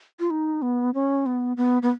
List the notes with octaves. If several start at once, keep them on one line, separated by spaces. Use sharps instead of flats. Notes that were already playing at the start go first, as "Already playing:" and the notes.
F4
D#4
B3
C#4
B3
B3
B3